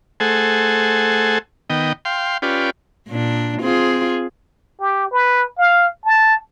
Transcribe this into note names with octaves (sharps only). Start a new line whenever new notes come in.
A3 G#4 A4 C5 F#5 G#5
D#3 B3 D#5 G5
F5 G5 C6
C#4 F4 G4 B4 D5
A#2 D4
C4 F4 G#4
G4
B4
F5
A5